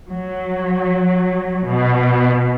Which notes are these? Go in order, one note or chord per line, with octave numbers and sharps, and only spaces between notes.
F#3
B2